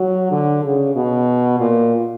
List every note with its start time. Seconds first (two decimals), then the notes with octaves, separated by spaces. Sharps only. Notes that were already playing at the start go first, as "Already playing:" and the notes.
Already playing: F#3
0.31 D3
0.64 C#3
0.95 B2
1.60 A#2